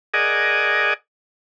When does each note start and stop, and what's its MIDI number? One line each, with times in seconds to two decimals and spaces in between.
0.14 0.94 68
0.14 0.94 70
0.14 0.94 74
0.14 0.94 75
0.14 0.94 78
0.14 0.94 80